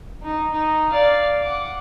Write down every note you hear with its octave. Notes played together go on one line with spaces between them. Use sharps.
D#4
D#4
D5 F5
F#5 D6